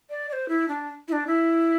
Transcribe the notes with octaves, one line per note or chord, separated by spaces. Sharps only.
D5
D5
C5
E4
D4
E4
D4
E4